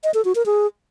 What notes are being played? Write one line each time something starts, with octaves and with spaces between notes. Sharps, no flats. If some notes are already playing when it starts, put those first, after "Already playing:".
D#5
A4
F#4
A#4
G#4